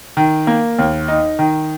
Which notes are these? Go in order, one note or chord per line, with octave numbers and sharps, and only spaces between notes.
D#3
A#3
D#2
D#4
D#3